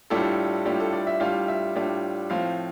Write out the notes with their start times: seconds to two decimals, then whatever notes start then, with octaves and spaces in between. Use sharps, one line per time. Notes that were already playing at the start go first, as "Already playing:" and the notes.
0.10 A2 G3 D4 F4 A4
0.66 A2 G3 D4 F4 G4
0.80 A4
0.93 D5
1.07 E5
1.20 A2 G3 D4 F4 F5
1.48 E5
1.75 A2 G3 D4 F4
2.30 A2 F3 C4 F4 F5